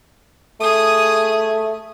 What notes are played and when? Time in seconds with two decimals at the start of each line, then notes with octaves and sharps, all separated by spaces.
0.60 A3 G#4 D#6